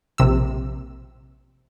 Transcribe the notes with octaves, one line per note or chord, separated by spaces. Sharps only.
A#1 C3 E6